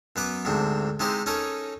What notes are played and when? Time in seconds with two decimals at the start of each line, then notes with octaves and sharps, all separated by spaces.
0.16 F#2 B3 B4 D6
0.45 D2 G#2 C3 D4
1.00 C3 G#3 D#4 E4 G4 C5
1.26 C#4 D#4 A4 A#4 C#5